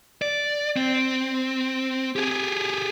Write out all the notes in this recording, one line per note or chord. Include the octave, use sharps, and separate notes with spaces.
D5
C4
G4 G#4